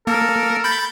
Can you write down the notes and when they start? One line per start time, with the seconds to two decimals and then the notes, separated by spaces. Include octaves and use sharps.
0.07 A#3 A4 A#4
0.64 B5 G6 A6